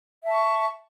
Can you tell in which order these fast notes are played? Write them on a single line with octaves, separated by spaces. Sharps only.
E5 A5 C#6